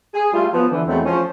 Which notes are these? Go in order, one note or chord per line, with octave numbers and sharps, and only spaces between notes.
G#4
G3 A3 F4
F3 F#3 B3
D3 E3
E2 F#3 G#3 A3 C4
F3 C#4